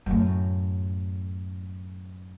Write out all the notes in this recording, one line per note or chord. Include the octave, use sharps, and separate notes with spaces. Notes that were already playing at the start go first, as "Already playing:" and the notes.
F#2 A2